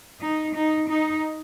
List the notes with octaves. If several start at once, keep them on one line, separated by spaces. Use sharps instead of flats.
D#4
D#4
D#4